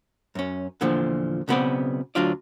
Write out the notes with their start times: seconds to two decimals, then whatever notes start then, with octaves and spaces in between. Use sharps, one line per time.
0.35 F#2 C#4
0.81 E2 A#2 D3 F3
1.48 B1 C#3 E3 B3 C4 D5
2.15 D2 F#3 D4 F4 D5